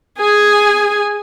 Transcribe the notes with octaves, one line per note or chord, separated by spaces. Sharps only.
G#4 G#5